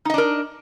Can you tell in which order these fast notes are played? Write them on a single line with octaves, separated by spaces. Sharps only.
D#4 D#5 D4 A#4